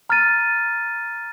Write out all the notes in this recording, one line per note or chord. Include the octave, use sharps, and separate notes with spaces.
A#5 F6 A6 D#7